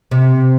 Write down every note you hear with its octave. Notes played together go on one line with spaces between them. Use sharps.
C3